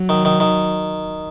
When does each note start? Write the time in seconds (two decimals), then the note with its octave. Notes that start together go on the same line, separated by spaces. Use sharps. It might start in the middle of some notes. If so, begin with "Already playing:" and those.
Already playing: F#3
0.09 D#3
0.25 D#3
0.40 D#3